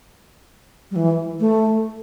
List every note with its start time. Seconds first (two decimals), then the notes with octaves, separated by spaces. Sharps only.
0.91 G3
0.96 E3
1.40 A3